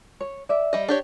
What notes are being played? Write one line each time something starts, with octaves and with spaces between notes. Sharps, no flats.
C#5
D5 E5
G3 D#5
D4 G4 C#5